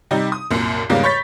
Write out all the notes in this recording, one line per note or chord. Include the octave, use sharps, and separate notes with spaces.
C3 G3 D#4
D#6
C2 F#2 A#2
E2 G#2 C#3 G3 A#3 C#4
C#5 B5 C#6 G6 A6 B6